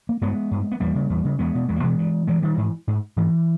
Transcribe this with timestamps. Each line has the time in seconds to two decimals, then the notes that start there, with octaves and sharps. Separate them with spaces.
0.09 A#3
0.21 G2 G#3 B3
0.51 G2
0.72 B3
0.80 E2 G3 A#3
0.95 C#3
1.10 E2
1.25 C#3
1.39 E2 G#3 B3
1.55 B2
1.69 E2 G#3
1.76 A#3
1.83 B2 E3 G#3
1.98 G2
2.28 G2 E3 G#3
2.42 D#3 G3
2.57 G#2 E3
2.88 G#2
3.17 G#2 E3